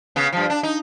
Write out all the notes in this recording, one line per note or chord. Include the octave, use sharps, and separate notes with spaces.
C#3 B3
G2 F3
D4
D#4